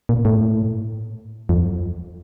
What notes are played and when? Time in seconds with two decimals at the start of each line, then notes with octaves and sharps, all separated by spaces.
0.09 A#2
0.25 A2
1.49 F2